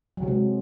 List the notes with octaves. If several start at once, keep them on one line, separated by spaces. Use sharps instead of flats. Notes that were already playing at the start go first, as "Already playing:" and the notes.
F#3
C3
G#3